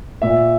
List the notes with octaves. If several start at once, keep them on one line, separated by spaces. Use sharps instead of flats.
A#2 E5